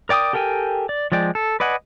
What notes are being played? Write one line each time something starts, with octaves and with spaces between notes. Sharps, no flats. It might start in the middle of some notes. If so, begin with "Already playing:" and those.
A#4 D5 G5 D6 D#6
G4 A4 A#4 G5 G#5
D5
F3 G#3 D5 G5
A4
B4 D5 D#5 F#5 G#5